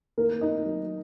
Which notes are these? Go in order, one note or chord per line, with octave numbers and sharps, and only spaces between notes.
D#3 A#3 A#4
D#3 D#4 D#5
F#3